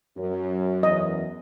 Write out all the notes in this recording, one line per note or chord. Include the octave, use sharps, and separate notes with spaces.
F#2 F#3
E2 D#5